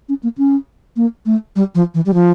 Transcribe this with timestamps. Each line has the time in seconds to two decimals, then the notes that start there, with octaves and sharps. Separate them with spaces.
0.09 C#4
0.23 A#3
0.38 C#4
0.96 A#3
1.26 A3
1.56 G3
1.75 F3
1.94 E3
2.06 G3
2.14 F3